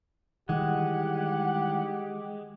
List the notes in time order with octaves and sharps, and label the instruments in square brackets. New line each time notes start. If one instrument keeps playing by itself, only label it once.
[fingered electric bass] D#3 E3 G3 [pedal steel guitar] G#3 [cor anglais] G4 [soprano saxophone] F#5